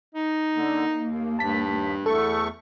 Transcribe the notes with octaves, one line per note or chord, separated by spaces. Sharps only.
D#4
D3 A#3
D#2
G2 A5 B6
E2 A3 A4 C#6